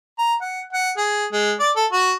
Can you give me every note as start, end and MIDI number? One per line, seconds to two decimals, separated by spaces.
0.19 0.34 82
0.41 0.61 78
0.73 0.91 78
0.97 1.25 68
1.32 1.53 56
1.60 1.71 74
1.76 1.86 69
1.92 2.13 66